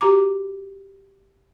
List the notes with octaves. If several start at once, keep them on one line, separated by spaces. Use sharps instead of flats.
F#4 G4 A#5 D6